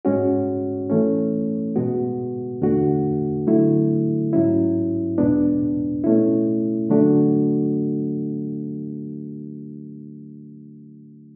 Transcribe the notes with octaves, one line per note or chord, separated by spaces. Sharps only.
G#2 G#3 C#4 F#4
E3 A3 C#4
B2 G#3 B3 F#4
E2 D3 A3 D4 F#4
D3 F#3 A3 E4
G#2 F#3 C#4 E4
E2 B2 G#3 B3 D4
B2 A3 C#4 E4
D3 F#3 A3 D4 F#4